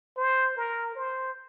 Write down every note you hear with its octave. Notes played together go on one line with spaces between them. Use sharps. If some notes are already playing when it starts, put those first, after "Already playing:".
C5
A#4
C5